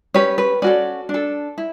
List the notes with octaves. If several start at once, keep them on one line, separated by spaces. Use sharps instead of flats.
C#4 G4 B4 C#5
B4
C#4 F#4 A4 D5
D4
A4
E4